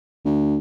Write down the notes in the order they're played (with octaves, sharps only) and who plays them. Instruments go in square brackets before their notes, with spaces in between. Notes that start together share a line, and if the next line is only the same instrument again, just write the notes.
[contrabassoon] D2